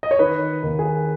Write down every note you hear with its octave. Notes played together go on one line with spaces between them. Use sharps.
D#5
C#5
D#3 B4
D#2
G#4